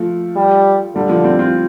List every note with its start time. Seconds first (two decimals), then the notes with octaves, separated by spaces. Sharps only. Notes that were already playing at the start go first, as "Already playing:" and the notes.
Already playing: F3 A3
0.36 G3
0.96 D3 G3
1.09 F3 A3
1.24 G3 C4
1.39 C4 F4